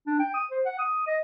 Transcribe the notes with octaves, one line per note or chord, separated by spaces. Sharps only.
D4
G5
D#6
C5
F#5
D#6
D#5